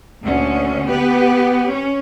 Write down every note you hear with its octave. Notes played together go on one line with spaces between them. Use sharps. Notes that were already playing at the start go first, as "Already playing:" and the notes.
D2 A#2 D3 C#4
B3 G4 B4
C#4